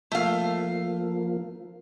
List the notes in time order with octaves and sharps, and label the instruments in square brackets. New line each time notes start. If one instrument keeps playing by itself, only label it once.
[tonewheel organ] F3 A#3 [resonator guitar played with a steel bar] A3 F5